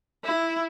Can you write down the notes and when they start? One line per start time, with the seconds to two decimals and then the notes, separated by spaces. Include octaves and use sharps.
0.25 E4